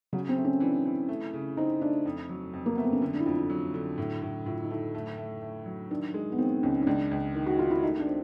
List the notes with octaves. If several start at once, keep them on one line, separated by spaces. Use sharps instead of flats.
C#3 F#3
C4
A3
C#4
E3 D4
E3
A3
C#3
C4 D#4
A3 D4
F2
F#3
F2
A#3
A3 B3
C4
C#4
D3 D4
D4
E4
F2 F4
E4
F#3
D3
A2
A2
A2 F4
D#4
A3 E4
A3
A3
A3
F#3
D#3 D4
G#3
B3
D#3 C4
C#2 C#4
C#4
C#2 D4
C#2
D#3
F#4
D#3 F4
E4
A3 D#4
D4
C4